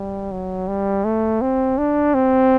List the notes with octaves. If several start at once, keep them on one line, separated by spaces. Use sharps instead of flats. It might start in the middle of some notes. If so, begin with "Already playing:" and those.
Already playing: G3
F#3
G3
A3
C4
D4
C4